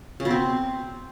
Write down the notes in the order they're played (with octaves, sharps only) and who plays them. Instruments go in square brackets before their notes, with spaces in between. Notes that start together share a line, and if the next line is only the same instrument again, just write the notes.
[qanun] C#3
B2
C4